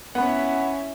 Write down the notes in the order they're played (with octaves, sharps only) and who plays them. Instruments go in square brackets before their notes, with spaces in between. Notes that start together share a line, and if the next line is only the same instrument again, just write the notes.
[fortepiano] B3 [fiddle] C#4 E4 [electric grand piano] F#5 B5